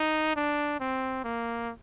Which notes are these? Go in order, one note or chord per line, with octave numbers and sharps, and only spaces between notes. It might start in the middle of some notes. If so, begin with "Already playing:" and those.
Already playing: D#4
D4
C4
A#3